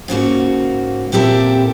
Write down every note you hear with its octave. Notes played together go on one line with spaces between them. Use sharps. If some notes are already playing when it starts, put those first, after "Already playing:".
G#2 C#3 A#3 F#4
A#2 C4 E4 G4 A4 A#4